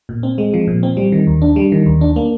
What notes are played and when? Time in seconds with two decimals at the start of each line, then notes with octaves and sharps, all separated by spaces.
0.09 A#2
0.23 C4
0.38 G#3
0.54 F3
0.67 A#2
0.83 C4
0.97 G3
1.12 D#3
1.27 D#2
1.42 D4
1.56 G3
1.72 D#3
1.86 D#2
2.01 D4
2.16 A#3